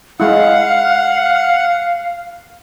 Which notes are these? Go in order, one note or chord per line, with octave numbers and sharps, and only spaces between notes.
G#3 E4 F5 F#5